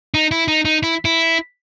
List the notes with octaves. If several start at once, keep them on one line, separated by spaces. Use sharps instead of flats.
D#4
E4
D#4
D#4
E4
E4